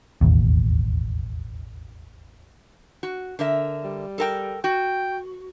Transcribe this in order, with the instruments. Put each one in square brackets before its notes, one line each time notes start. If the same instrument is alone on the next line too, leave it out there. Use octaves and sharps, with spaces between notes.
[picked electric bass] E1 A1 D#2
[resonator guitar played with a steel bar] F#4
D3 A#4 E5
[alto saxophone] G3
[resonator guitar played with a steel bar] A4 A#4 G5
[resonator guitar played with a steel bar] F#4 [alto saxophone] G5